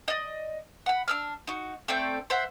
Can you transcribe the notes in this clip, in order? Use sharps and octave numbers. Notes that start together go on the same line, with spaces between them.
D5 D#5
F#5 B5
D4 E6 F6
D#4 F#4
A3 C4 D5 G5
C5 E5 F#5